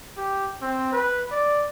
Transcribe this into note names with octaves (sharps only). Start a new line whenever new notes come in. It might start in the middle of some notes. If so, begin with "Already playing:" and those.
G4
C4
B4
D5